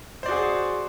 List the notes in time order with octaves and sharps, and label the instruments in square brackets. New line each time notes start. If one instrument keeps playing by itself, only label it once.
[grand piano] C5
D5
F#4
G#4